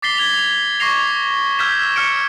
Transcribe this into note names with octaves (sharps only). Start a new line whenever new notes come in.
D6 A6 B6 C7 G7
G#6 B6 F7 G7
C#6 D6 A#6 C7 F7
E6 F6 G6 G#6 B6 E7
F6 C#7 D7